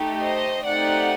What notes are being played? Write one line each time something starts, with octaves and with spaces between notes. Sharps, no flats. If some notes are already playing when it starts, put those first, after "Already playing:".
Already playing: A3 D#4 G4
C5 D#5
A3 C4 D#4 G4 D5 F#5